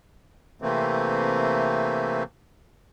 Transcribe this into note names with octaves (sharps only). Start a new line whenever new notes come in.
C3 E3 A3 A#3 C4